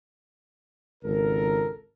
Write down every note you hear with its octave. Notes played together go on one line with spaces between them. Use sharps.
G#1 C#2 A4 A#4